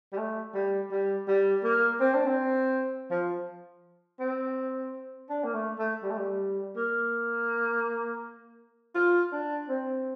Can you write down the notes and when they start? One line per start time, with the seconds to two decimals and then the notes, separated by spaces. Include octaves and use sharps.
0.12 G3
0.18 A3
0.54 G3
0.91 G3
1.28 G3
1.64 A#3
2.00 C4
2.15 D4
2.27 C4
3.10 F3
4.20 C4
5.29 D4
5.44 A#3
5.54 A3
5.78 A3
6.03 G3
6.10 A3
6.17 G3
6.76 A#3
8.95 F4
9.32 D4
9.69 C4